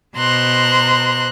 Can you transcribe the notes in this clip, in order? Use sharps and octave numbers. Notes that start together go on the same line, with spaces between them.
B2 C5 A#5 C6 F#6